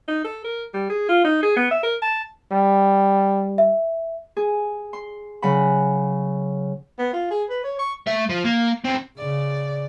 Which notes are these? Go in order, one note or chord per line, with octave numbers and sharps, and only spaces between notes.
D#4
A4
A#4
G3
G#4
F4
D#4
G#4
B3
E5
A#4
A5
G3
E5
G#4
C6
C#3 F#3 F#5 B5
B3
F4
G#4
B4
C#5
C#6
A3 E5
F3
A#3
E2 C4
C#3 D5